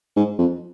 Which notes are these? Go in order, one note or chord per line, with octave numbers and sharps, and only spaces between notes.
G#2
F2